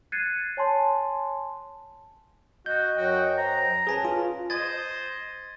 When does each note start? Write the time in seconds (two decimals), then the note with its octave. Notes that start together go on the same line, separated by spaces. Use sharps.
0.12 F#6 G#6 A6 C7 C#7 D#7
0.57 C#5 G#5 A5 C6
2.66 F#4 D#5 G6
2.96 F#2 F#3 F#4 G5
3.37 C5 A#5
3.87 C#4 G#4 B4 G#5 A5
4.05 F4
4.50 C5 D#5 G#6 A6